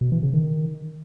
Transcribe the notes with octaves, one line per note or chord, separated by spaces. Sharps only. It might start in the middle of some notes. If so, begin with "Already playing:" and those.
B2
E3
C#3
D#3